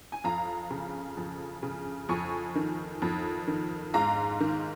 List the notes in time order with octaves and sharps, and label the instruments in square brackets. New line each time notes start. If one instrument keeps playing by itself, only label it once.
[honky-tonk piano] G#5
F2 F5 A#5
C#3
F2
C#3
F2 G#5 C#6
D#3
F2
D#3
G#2 F5 A#5
D#3